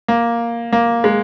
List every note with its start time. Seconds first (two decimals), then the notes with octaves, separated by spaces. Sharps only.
0.08 A#3
0.73 A#3
1.04 G#3